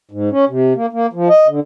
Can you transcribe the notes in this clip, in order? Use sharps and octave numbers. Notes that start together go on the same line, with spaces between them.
G#2
C#4
C3
A#3
A#3
F3
D#5
D3